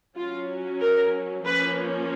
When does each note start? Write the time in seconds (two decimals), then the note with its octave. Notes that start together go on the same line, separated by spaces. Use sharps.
0.16 F#3 C#4 F4
0.80 A#4
1.45 F3 A#3 C#4 B4